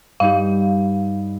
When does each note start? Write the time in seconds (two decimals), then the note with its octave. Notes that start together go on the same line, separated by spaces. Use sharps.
0.20 G2 D#4 G4 F5